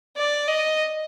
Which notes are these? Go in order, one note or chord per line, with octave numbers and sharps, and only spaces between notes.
D5
D#5